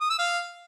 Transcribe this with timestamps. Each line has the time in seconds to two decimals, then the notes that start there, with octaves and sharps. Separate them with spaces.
0.01 D#6
0.10 E6
0.19 F5